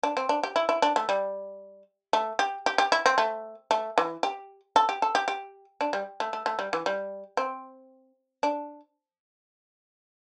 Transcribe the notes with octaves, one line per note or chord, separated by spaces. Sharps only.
D4
C4
D4
G4
E4
E4
D4
A3
G3
A3
G4
G4
G4
E4
C4
A3
A3
E3
G4
A4
G4
A4
G4
G4
D4
G3
A3
A3
A3
G3
E3
G3
C4
D4